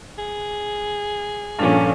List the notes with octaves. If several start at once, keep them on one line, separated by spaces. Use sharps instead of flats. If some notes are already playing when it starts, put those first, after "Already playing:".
G#4
G2 A#2 F3 C#4 D4 A4 F5